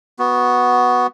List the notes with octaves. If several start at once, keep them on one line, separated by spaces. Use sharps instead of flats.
B3 F#4